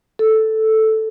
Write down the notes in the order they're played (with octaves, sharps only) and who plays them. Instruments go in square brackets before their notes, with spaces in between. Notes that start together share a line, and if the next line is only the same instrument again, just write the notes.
[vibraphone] A4